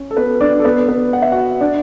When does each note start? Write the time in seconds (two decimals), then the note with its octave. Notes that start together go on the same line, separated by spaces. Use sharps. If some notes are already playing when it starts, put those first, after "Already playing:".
Already playing: C#4
0.11 A4
0.17 B3 B4
0.41 D4 D5
0.60 A4
0.65 B3 B4
0.88 B3 B4
1.13 F#5
1.22 E5
1.32 F#4 F#5
1.61 D4 D5